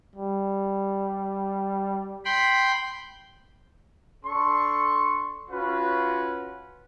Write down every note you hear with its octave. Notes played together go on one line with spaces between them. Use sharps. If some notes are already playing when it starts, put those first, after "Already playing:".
G3
G5 B5 C6
D4 A4 C6 C#6
C#4 F4 F#4 B4